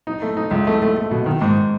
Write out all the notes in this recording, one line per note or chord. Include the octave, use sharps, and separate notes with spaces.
D#4
A3
D#4
C#2
A3
A3
A3
B2
D#3
G#2